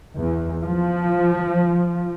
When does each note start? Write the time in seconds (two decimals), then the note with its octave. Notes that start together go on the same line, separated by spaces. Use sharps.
0.17 E2
0.64 F3